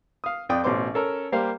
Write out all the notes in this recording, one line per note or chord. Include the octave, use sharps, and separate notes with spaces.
F5 D#6
F2 D5 G5 D6 D#6
A1 B2 C5 C#5 C6 D6
C#4 A4 A#4
G3 A#3 G4 C5 F5